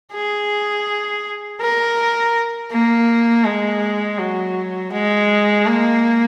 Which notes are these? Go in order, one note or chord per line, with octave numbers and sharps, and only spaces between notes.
G#4
A#4
A#3
G#3
F#3
G#3
A#3